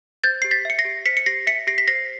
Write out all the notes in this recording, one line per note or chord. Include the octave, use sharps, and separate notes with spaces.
C5 G6 A6
G4 C7
A6 B6
E5 C#7
A#6 C7
G4
C5 B6 C#7
C#7
G4 A#6 C7
E5 B6 C#7
G4 A#6 C7
B6
C5 A#6 C7